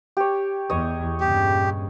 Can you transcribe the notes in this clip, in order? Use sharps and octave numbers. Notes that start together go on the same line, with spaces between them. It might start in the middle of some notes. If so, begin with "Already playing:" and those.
G4 C#5
E2 C#5 D#5
G2 A#2 C#3 G4